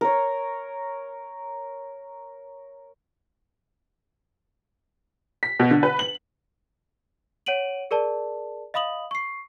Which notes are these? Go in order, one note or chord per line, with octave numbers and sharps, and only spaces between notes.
A#4 C#5
B6
B2
D3
B4
F#7
C#5 F#5 D7 D#7 F#7
G#4 A#4 D5 A5
D#5 F5 B5 D#6 F#7
C#6 C7